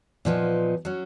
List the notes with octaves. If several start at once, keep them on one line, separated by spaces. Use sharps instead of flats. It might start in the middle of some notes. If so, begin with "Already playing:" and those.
A#2 F3 B3 D#4
F#3 C#4